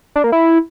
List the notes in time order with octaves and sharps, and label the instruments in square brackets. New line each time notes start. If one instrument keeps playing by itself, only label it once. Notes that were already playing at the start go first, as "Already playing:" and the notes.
[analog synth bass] D4
A#3
E4